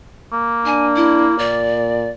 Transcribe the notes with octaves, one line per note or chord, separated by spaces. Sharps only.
A#3
D4 G#5
E4
A#2 D5